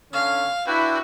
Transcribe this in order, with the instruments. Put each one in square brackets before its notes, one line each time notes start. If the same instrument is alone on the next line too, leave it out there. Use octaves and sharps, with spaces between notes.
[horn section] D3 C#4 [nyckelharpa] F5
[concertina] D4 B4 G5 [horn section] E4 [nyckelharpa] F#4